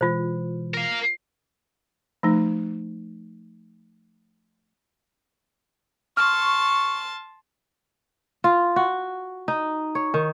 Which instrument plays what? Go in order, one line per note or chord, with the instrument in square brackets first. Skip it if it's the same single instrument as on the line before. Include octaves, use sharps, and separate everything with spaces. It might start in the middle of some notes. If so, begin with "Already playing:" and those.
[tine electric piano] B2 E3 G#3 [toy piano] F4 C5
[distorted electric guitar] A#4 F5
[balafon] F3 A3 D#4
[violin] A5 C6 [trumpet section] C#6 [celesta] F6
[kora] F4
F#4
D#4
C#5
D#3